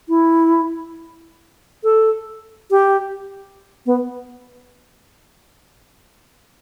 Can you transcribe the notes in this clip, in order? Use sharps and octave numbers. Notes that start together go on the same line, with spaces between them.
E4
A4
G4
B3